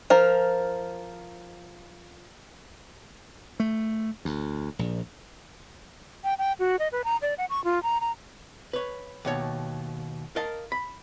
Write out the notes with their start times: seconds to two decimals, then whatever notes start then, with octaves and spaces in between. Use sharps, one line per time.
0.10 F3 A#4
3.60 A3
4.25 D2
4.79 A#1
6.24 G5
6.39 G5
6.59 F#4
6.79 D#5
6.92 B4
7.04 A#5
7.22 D5
7.38 F#5
7.50 C#6
7.64 F4
7.83 A#5
8.01 A#5
8.73 B4 C#5
9.25 D#2 B2 C#5
10.36 A#4 D#5 F5 A5
10.72 B5